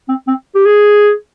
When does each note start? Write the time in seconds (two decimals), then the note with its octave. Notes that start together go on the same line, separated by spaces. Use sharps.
0.08 C4
0.27 C4
0.55 G4
0.65 G#4